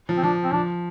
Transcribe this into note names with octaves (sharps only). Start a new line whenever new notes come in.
F3
C4
F3 D4
C4
F3 D4